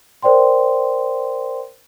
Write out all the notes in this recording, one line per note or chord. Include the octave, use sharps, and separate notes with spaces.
A#4 C5 D5 G5 C6